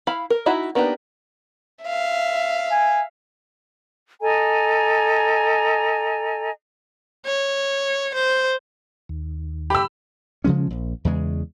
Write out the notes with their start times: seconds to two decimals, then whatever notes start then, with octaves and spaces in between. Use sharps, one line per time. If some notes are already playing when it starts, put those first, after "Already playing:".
0.07 E4 F5 B5
0.30 A#4
0.46 D#4 E4 F#4 E5
0.75 A#3 B3 D4 D#4 G4
1.84 E5 F5
2.71 G#5
4.21 A4 D#5 G#5 A#5
7.26 C#5
8.15 C5
9.09 D#2
9.70 G4 B5 E6
10.44 C#3 F3 G#3 C#4
10.70 A#1
11.05 E2 C#3 G#3